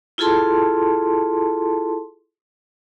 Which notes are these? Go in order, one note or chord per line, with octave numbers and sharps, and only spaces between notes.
E4 F4 G#4 A4 A5 C6